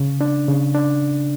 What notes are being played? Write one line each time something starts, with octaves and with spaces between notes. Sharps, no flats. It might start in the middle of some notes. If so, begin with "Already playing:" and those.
Already playing: C#3
D4
C#3
D4